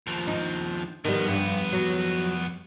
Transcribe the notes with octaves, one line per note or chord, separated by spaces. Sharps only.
D#2 F3
D#4
F2 D#3 G3 B3
G2
F#3